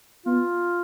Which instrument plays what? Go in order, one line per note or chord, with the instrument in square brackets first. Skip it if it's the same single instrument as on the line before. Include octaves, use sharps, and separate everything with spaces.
[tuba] B3 [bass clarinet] F4